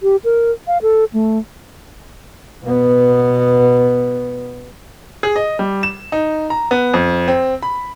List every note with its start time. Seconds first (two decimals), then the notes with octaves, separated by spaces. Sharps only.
0.03 G4
0.24 A#4
0.67 F5
0.82 A4
1.14 A3
2.64 B2 B3
5.23 G#4
5.36 D#5
5.59 G3
5.83 E7
6.12 D#4
6.50 A#5
6.71 B3
6.94 F2
7.28 C4
7.63 B5